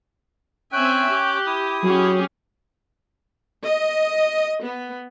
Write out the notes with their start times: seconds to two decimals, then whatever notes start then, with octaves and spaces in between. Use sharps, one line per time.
0.72 C4 C#4 E5 G5 G#5 F#6
1.10 G4
1.47 E4 D#6
1.83 F#3 C#4 G4 G#4
3.64 D#5
4.64 B3